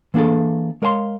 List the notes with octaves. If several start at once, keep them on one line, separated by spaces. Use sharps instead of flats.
E3 A#3 D4 G#4 A4
G#3 A#4 C#5 F5 G#5 C6